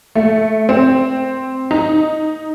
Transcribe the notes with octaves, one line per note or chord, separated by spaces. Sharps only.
A3
C4
D#4